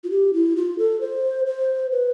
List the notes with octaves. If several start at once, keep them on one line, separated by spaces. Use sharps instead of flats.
F4
G4
E4
F4
A4
C5
C5
B4